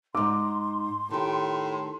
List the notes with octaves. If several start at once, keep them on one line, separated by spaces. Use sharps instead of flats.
G#2 D#4 C6 D6
A2 D#3 G4